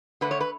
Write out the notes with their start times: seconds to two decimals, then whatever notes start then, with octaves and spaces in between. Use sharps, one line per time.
0.21 D3 A3 B4
0.31 C#5
0.41 B4